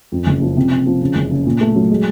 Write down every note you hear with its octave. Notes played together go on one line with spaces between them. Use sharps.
F2
F#1
F3
C3
C3
F3
C#3
F#1
C#3
A#2
A3
F#3
G#3